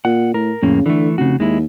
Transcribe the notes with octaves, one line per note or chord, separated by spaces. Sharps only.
A#2 F#5
A2 A#4
F2 A2 C#3 A#3
D3 E3 A3
F1 C#3 F#4
D#2 G#3 E4